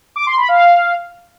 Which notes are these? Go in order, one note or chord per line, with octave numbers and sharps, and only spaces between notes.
D6
C6
B5
F5